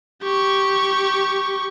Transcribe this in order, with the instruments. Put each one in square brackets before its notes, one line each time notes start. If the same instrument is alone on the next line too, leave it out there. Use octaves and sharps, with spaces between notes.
[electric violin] G4 C#6